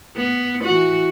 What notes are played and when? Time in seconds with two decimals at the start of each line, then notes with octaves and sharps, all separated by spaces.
0.17 B3
0.65 E3 F#4